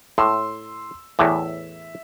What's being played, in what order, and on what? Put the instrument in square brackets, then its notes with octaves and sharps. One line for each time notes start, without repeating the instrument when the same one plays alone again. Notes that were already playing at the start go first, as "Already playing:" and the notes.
[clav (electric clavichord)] A2 [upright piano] C6 E6
[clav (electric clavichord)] E2 A2 E3 [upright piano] E5